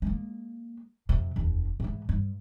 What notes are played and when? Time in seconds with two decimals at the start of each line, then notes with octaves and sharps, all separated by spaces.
0.02 G#3 A#3
1.09 F2 C3
1.36 F1 D#2
1.80 G#2 E3
2.09 G2